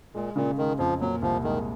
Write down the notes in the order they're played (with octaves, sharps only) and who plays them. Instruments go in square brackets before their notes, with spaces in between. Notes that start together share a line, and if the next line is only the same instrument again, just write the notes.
[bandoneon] A#2 [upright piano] G#3
[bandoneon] A#2 [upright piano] C#3
[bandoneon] D#3 [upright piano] G#3
[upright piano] F2 [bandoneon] F3
[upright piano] A#2 [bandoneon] F#3
[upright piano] C2 [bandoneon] F3
[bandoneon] D#3 [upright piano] G#3